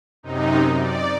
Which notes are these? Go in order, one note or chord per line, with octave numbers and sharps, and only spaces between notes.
F#2 C3 D#4
D5